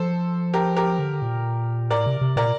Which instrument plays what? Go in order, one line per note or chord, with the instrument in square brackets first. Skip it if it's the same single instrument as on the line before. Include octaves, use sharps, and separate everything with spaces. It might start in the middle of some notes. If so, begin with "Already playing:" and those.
Already playing: [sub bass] F3 [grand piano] A4 C5
[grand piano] G4 A#4
G4 A#4
[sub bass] D3
A#2
[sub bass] A2 [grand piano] A#4 D5
[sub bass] C3
C3
[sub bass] A#2 [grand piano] A#4 D5